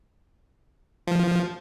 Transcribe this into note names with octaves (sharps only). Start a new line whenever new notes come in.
F3